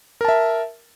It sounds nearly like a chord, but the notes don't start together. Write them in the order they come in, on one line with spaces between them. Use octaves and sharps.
A#4 A5 E5